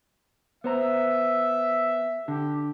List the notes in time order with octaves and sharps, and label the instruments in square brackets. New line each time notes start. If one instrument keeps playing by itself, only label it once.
[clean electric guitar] B3 C5 A#5 [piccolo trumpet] E5
[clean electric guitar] D3 [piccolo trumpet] G4